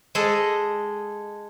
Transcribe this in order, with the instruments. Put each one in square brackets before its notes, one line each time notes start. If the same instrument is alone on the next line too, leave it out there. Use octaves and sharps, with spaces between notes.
[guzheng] G#3 G#4 A4 D#5